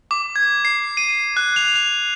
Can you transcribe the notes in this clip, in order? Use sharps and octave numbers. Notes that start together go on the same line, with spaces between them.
D6
G#6
C7
D#7
F#6
F7
F7